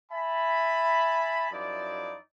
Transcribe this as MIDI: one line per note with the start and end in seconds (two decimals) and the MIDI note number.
0.11 1.49 76
0.11 1.49 80
0.11 1.49 81
0.11 1.49 83
1.51 2.17 42
1.51 2.17 53
1.51 2.17 63
1.51 2.17 64
1.51 2.17 74